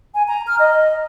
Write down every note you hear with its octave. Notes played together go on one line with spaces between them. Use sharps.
G#5
A#5
F6
D#5